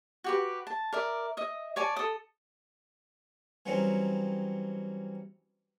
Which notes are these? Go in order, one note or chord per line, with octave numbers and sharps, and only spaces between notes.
F#4 G4 B4
A5
A#4 D5 E5
D#5 E5
C#5 D5 G#5 A5
A4 D#6
E3 F#3 G3 C4 C#4 D#4